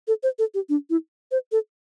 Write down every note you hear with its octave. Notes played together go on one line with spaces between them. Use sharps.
A4
C5
A4
G4
D4
E4
C5
A4